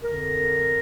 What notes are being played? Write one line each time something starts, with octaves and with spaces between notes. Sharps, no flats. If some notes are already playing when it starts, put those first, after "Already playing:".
F2 D3 A#4